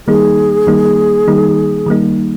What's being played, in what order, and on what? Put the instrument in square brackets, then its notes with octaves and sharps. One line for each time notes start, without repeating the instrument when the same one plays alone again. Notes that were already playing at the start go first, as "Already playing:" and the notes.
[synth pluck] D#3 G3 A#3 D#4 [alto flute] G#4
[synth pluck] D#3 G3 A#3 D#4
D#3 G3 A#3 D#4
D#3 G3 A#3 D#4